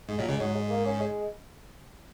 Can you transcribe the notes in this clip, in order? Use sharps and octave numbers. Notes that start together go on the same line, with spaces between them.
G#2 G#3
A#1 A#2 F#3
C#2 C#3 G#3
G#2 F#3
G#3
A#3
C#4
G#3